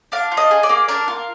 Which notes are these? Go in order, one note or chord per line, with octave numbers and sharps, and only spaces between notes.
D4 F5
F4
D#5
G#4
D5
A#3
D4 A#4
F4